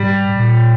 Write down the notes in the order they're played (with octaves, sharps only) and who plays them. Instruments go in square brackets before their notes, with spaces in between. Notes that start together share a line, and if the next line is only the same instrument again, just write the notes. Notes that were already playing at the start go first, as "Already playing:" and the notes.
Already playing: [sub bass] G#2 [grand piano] G3
[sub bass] A#2